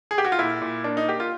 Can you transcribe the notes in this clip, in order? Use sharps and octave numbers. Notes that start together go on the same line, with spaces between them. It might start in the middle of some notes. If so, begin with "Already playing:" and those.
G#4
G4
F#4
F4
A#2 E4
A#2
A#3 D4
D#4
A#3 G4
F4